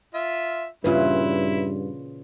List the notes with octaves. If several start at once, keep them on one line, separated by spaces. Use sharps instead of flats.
F4 E5
G2 A#2 C#3 E3 E4 F4 B4